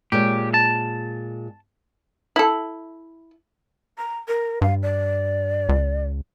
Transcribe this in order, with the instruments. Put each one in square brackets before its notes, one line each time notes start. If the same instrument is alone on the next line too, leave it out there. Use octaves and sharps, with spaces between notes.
[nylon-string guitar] A#2 G#3 C#5 [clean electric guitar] G4
[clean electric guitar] A5
[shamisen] E4 A4
[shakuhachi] A#5
A#4
[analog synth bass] G2 [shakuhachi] F5
[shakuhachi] D5
[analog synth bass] C#2